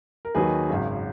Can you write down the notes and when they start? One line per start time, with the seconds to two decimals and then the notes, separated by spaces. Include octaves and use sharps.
0.25 A#4
0.35 D#2 D#3 F#3 G#4 B4
0.70 G#1 F#2 C#3